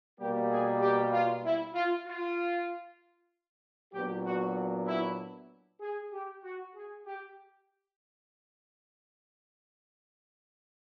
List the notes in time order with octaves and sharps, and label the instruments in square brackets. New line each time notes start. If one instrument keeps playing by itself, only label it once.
[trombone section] B2 G3 A#3 [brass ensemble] G4
[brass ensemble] G#4
G4
F4
E4
F4
F4
[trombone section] A#2 F#3 B3 D4 [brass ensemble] G4
[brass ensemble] F#4
E4
G#4
G4
F#4
G#4
G4